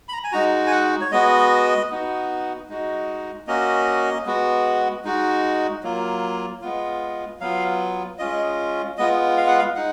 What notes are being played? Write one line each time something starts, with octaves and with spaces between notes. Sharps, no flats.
B5
A#5
G#5
G#3 D#4 F#4 A#5
G#5
F#5
C#5
G#3 B3 F#4 D#5
B3 D#4 F#4
G#3 D#4 F#4
A#3 C#4 F#4 D#5
G#3 B3 F#4
G#3 D#4 F#4
F#3 A#3 F4
G#3 B3 F4
F#3 B3 F4 F5
G#3 C#4 F4 D#5
G#3 B3 F4 D#5
F5
F#5
F5
G#3 D#4 F#5